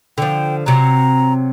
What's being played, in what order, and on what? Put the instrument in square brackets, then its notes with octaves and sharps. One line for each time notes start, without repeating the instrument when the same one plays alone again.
[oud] D3 F3 [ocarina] G5
[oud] C3 F#3 [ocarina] A#5